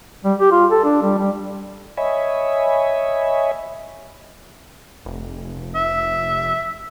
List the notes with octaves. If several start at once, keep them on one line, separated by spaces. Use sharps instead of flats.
G3
G4
F4
A4
D4
G3
G3
C#5 D#5 E5 G#5 B5
F1
E5